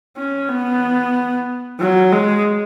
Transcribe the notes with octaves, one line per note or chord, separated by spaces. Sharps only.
C#4
B3
F#3
G#3